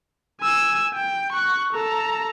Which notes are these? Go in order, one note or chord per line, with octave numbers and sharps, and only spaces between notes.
G#5 E6
G5
C#6 F#6
A4 A#5